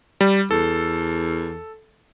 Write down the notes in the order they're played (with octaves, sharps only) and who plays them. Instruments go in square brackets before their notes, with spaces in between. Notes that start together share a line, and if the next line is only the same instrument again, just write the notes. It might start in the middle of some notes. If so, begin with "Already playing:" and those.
[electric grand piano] G3
[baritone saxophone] E2 [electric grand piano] A4